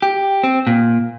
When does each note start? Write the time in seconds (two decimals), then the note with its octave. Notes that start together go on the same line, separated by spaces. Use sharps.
0.02 G4
0.43 C4
0.67 A#2